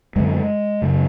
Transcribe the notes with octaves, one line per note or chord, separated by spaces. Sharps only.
F#2 D3 G#3
F#2 C#3